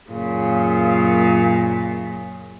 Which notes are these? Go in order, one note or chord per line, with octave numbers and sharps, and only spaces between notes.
F#2 A#2 C#3